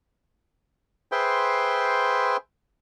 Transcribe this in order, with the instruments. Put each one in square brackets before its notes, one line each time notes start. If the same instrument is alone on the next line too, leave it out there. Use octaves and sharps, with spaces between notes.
[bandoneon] G#4 B4 C5 E5 G5 C6